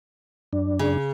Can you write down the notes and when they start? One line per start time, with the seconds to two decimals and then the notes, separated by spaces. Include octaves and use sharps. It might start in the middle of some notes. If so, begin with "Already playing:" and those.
0.53 F#2 D4
0.79 C#3